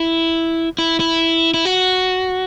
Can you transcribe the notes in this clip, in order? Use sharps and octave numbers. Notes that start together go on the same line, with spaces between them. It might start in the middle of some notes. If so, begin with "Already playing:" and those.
Already playing: E4
E4
E4
E4
F#4